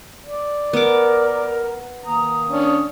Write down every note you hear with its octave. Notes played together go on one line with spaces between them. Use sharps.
D5
B3 A#4 D6
D#3 A#3 A#5 D#6
C#4 D4